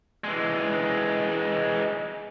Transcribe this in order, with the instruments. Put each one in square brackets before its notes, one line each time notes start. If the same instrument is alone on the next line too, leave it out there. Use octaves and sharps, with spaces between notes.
[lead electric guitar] E3 G#3